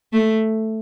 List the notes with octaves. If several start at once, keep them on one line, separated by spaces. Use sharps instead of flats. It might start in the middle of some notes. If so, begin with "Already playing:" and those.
A3